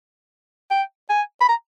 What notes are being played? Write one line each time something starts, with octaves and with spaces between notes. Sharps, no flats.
G5
G#5
B5
A#5